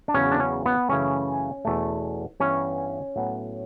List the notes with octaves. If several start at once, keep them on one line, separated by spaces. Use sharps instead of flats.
D4
E2 C#3 F#3 B3 C#4
D4
C#4
B3
F#2 C#3 E3 A3 C#4
E2 B2 A3
G2 E3 B3 C#4
A2 F#3 B3